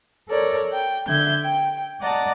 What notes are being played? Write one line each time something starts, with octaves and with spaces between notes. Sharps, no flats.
A4 A#4 C#5 D5
G5
D3 E5 G6 G#6
G5
D5 D#5 F#5 A5 A#5